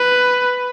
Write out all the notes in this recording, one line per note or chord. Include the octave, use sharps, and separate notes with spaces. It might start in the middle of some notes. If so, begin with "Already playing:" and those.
Already playing: B4